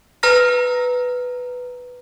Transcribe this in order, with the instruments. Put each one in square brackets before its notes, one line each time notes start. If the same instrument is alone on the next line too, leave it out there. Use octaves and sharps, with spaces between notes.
[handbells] B4 A#5 F6 A#6